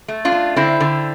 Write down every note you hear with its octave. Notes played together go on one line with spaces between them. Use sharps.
A3
D4 F4
A3
D3 C4 E4
D3